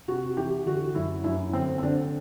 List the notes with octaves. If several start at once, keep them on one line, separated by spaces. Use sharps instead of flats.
C3 F#4
E3 G4
D3 F#4
F#2 E4
F#2 E4
D3 C4
C4
D3 D4